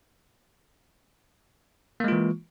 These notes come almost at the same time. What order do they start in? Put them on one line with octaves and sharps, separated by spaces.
A#3 G#3 F4 E3